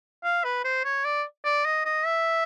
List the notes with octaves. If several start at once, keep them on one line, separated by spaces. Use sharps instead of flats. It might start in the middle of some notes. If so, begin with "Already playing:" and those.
F5
B4
C5
C#5
D5
D5
D#5
D#5
E5